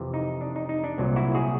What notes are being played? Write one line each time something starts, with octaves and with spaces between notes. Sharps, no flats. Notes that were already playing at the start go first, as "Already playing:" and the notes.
Already playing: F2 C3 E3
D#4
D4
D#4
D#4
D4
C2 A#2 F#3
E4 F#4
F#4 G#4